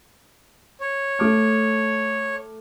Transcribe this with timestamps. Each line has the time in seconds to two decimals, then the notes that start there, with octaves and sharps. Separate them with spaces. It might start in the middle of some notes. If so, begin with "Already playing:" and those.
0.81 C#5
1.19 A3 D6 F6